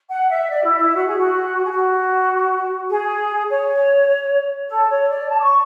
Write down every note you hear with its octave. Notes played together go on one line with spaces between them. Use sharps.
F#5
E5
D5
E4
E4
F#4
G#4
F#4
G#4
F#4
G#4
C#5
A4
C#5
D5
A5
D6
C#6